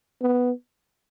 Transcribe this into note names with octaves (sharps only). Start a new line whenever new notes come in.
B3